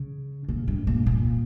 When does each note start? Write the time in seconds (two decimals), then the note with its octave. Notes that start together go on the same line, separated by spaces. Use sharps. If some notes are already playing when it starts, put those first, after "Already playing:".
Already playing: C#3
0.48 A#2
0.68 G2
0.87 A#2
1.06 A#2